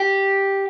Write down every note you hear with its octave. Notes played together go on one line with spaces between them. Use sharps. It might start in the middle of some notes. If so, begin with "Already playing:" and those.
Already playing: G4